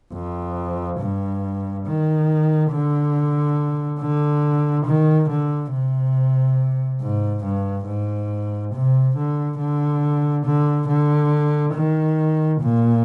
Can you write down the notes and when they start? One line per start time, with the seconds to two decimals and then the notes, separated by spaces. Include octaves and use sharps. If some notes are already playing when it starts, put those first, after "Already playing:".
0.12 F2
0.99 G2
1.86 D#3
2.71 D3
4.00 D3
4.86 D#3
5.29 D3
5.72 C3
7.01 G#2
7.44 G2
7.86 G#2
8.74 C3
9.17 D3
9.59 D3
10.45 D3
10.88 D3
11.74 D#3
12.61 A#2